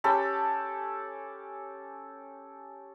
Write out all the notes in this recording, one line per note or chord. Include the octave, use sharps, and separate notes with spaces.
C#4 G4 A4 B5